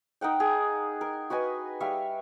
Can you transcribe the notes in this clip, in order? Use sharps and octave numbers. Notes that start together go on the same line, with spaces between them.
D#4 A#4 F#5 G5
G#4
A#4
F#4 B4 D#5 G#5
G3 E5 F5 C#6